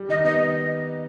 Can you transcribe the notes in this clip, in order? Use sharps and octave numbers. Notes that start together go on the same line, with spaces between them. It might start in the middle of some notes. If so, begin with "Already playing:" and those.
Already playing: G3
D#3 D#5
B3 D#5